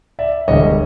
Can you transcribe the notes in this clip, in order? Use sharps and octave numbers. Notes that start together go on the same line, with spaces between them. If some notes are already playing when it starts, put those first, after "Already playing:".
D5 E5
E1 D2 D3 G3 C#5 D#5